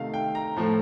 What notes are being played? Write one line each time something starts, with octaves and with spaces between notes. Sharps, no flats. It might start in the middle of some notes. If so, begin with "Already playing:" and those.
Already playing: C3 D#3 A3 F5
G5
A#5
A2 F3 A3